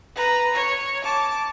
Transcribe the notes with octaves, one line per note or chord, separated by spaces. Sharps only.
B4 A#5
C#5
A5 D6